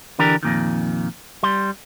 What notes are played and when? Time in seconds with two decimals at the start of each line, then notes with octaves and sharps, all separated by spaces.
0.19 D3 E3 D4 G4 A#4
0.43 F2 A#2 D#3
1.43 G3 C6